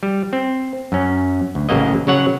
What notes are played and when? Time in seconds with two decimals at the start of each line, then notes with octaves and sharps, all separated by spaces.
0.03 G3
0.33 C4
0.92 F#2 C#4
1.55 D2
1.69 A1 C#3 F#3 A#3 D#5
2.07 C#3 F#3 C#5 F#5